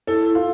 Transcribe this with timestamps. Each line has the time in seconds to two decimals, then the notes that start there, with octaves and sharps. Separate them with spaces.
0.07 E4 A4
0.26 E4
0.35 F4